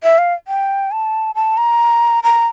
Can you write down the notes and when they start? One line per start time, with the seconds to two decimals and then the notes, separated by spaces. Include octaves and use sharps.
0.03 E5
0.18 F5
0.48 G5
0.91 A5
1.35 A5
1.57 A#5
2.24 A#5